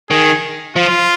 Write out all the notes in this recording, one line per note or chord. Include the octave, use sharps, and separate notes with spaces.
D#3 G#4
F3 F4